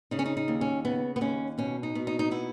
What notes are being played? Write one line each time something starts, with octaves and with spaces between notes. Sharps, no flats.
C#3 D#4
C#4
D#4
D#4
D#2
C#4
C#3 B3
B3
D#2 C#4
B2 C#4
D#4
B2
D#4
D#4
B3 E4